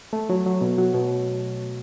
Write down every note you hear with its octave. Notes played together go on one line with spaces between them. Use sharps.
A3
F#3
F#3
B2
F#3
B2